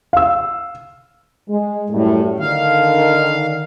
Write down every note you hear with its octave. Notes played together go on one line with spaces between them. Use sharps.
F5 E6
G#3
F#2 A2 G3 A3
D3 D#3 F5